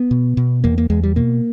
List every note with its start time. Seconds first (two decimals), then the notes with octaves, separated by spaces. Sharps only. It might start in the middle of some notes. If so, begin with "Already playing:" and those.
Already playing: B3
0.11 B2
0.37 B2
0.64 E2 A#3
0.78 A#3
0.90 E2 G#3
1.04 G3
1.16 B2 A#3